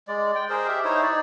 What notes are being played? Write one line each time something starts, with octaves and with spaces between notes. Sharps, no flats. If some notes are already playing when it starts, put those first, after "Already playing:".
G#3 D5
G5
G#4 A#4 C5
G4 E5
D#4 E4 C5 C#5
D#4 D5